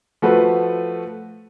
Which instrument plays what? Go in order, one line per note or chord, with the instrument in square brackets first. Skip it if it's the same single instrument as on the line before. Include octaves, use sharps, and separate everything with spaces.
[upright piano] F3 A3 F#4 B4